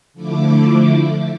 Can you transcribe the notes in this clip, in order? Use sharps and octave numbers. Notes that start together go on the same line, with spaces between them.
D3 F3 A3 E4 D6